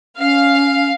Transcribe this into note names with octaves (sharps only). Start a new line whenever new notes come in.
C#4 F5